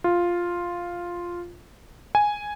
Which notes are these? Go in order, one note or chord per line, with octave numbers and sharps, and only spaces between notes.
F4
G#5